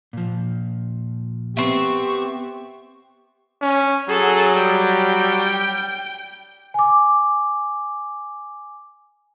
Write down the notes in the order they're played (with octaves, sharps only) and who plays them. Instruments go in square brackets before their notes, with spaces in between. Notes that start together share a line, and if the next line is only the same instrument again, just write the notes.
[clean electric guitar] A#2 F3
[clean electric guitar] B3 [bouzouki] C4 E5 [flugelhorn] G4 [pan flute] C#6
[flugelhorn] C#4
[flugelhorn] F#3 [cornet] G#4 [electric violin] A4
[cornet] G3 [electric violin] G5
[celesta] G#5 D6